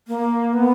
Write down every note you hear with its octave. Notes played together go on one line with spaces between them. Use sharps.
A#3
B3